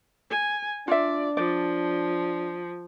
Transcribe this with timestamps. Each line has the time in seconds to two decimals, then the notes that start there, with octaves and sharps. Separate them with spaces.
0.30 G#5
0.88 D4 F4 D5 E5
1.37 F3 D5